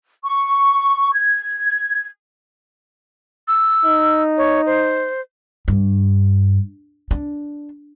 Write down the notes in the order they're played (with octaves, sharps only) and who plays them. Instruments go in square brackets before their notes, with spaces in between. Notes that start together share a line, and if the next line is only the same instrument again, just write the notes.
[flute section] C#6
G#6
[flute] E6
[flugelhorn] D#4
[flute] C#5
C5
[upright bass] G2
D4